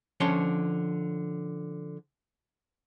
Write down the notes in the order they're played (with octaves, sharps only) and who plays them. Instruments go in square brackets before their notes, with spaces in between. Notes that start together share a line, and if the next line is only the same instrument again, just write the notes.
[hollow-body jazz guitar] D3 F3 C#4 C#5 C6